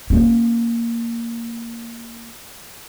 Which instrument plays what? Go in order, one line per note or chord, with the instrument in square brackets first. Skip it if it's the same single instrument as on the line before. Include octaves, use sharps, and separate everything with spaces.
[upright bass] A#3 C#4